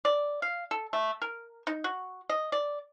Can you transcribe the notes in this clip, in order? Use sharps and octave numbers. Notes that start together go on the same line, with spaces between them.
D5
F5
A4
A3
A#4
D#4
F#4
D#5
D5